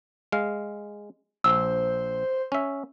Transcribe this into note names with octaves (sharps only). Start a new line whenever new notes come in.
G#3 F5
A#1 C5 E6
C#4 E5